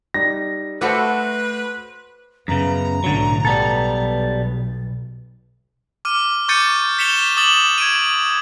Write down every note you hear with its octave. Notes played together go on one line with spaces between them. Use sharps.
G3 D#4 A#6
A3 F#4 A4 B4 C5 B5 D6
F#2 C#3 B3 A#5
B1 A2 D3 F#3
B1 G3 B3 A4
D6 F6 D#7
C#6 D6 G6 A6 C#7 D#7
B6 C#7 E7 F7 G7
D6 D#6 A6 E7 F#7 G7
G#6 D7 D#7